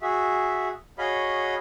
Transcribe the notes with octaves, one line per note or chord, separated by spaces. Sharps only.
F#4 G#4 E5
F#4 G#4 C#5 D#5 F5 B5